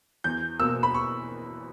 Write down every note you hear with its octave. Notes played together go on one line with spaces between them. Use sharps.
E2 G6
B2 A#3 E6
B5
C#6